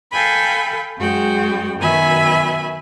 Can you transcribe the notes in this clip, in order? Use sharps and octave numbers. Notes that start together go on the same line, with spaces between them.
A4 F5 G5 G#5 B5
F#2 G#3 F#4 G5
F#2 B2 D#3 E5 G#5 B5